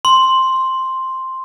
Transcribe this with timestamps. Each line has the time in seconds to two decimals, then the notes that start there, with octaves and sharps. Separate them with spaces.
0.05 C6